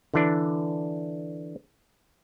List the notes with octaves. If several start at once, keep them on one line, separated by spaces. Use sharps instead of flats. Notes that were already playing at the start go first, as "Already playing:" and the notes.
D3 E3 D4